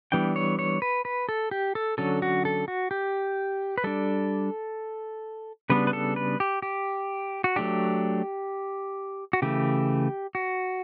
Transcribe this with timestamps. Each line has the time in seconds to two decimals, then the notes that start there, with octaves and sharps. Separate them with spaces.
0.12 E3 G3 B3 D4 G5
0.36 C#5
0.59 C#5
0.82 B4
1.05 B4
1.29 A4
1.51 G4
1.75 A4
1.98 D3 F#3 C#4 A4
2.22 F#4
2.45 A4
2.68 F#4
2.91 G4
3.78 B4
3.84 G3 D4 A4
5.70 C#3 G3 B3 D4 B4
5.87 B4
5.93 A4
6.16 B4
6.40 G4
6.62 G4
7.44 F#4
7.56 F#3 A3 D4 G4
9.33 F#4
9.42 C#3 E3 A3 G4
10.35 F#4